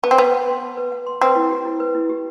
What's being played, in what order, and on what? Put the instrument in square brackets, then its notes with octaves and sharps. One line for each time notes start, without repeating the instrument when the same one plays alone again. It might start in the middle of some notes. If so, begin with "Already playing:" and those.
[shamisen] B3 [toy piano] A5
[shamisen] C4
[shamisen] B3 [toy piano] B4
[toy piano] F#5
C6
A5
B4
F#5
C6
[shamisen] C4 [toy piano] B4
[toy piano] E4
G4
E4
B4
E4
G4